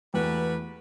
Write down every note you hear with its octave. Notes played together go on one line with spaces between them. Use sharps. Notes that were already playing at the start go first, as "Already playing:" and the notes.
E2 G3 A3 F#4 B4